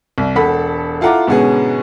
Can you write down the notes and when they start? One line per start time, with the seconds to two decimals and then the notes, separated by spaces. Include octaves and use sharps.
0.18 C2
0.36 E1 A4 F#5 B5 B6
1.01 E4 F4 A4 F#5 A#5 D6
1.27 G#2 B2 D3 B3 C#4 G#4